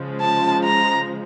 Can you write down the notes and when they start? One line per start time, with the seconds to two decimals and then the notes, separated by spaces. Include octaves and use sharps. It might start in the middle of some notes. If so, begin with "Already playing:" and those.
Already playing: C#3 F3 G#3
0.21 A5
0.64 A#5